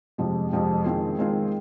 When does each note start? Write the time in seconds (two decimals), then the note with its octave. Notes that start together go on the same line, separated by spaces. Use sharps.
0.18 F2 C3 F3 G#3
0.52 F2 C3 F3 G#3
0.84 D#3 G#3 C4 F4 G#4
1.18 D#3 G#3 C4 F4 G#4